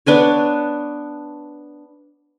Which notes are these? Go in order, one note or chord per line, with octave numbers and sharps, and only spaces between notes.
B3 D4 B4 C#5